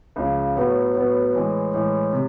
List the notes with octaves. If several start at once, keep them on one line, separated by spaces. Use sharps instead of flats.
C#2 C#3 F3
A2 F#3 B3
A2 F#3 B3
A2 E3 G#3
A2 E3 G#3
C3